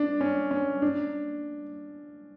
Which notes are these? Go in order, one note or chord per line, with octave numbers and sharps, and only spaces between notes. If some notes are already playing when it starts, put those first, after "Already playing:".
Already playing: D4
C#4
C#4
D4